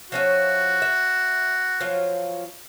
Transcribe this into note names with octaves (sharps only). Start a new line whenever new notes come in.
F3 C#4 F#4 E5
E5
F3 F#3 F4